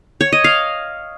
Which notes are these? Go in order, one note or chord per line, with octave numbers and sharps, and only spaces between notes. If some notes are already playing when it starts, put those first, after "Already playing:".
C#5
D#5
F5